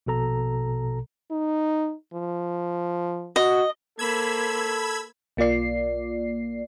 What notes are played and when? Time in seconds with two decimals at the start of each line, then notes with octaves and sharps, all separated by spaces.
0.06 A#1 B2 A4 A#5
1.31 D#4
2.13 F3
3.36 F#4 D#5
3.99 A#3 A4 C5 B5 E6 G#6
5.37 B1 A#3 F4 D5 C7